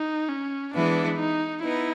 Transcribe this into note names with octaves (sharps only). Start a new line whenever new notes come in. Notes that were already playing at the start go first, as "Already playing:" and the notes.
Already playing: D#4
C#4
E3 G#3 B3 D4 E4
D#4
B3 D#4 E4